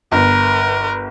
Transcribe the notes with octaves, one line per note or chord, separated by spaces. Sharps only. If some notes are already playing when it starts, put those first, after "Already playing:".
G1 A#4 B4